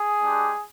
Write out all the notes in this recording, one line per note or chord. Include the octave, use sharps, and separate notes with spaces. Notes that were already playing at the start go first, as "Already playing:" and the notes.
Already playing: G#4
G#3 D4 G4